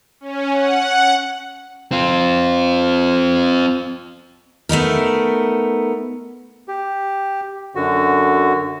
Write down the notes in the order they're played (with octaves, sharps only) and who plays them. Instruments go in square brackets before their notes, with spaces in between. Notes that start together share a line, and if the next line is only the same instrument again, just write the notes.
[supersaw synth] C#4
F#5
[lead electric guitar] C4 F4
[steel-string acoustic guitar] A3 B3 D#4 A#4
[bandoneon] G4
F#2 D3 F#4